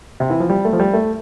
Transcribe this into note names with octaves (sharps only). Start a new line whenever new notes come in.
C3
E3
F3
G3
A3
F3
G3
A3